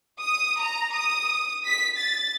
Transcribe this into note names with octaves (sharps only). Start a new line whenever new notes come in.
D#6
A#5
D#6
B6
A6